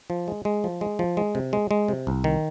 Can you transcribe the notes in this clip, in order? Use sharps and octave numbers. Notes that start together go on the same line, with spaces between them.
F3
G#3
G#3
F3
G#3
F3
G#3
C3
G#3
G#3
C3
C2
D#3